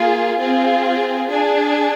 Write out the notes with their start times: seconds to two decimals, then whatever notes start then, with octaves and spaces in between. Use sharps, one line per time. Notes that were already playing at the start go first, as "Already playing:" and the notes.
Already playing: A#3 F4 G#4
0.41 C4 F4 G#4
1.29 D4 G#4